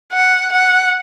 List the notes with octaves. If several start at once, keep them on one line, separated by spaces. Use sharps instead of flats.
F#5
F#5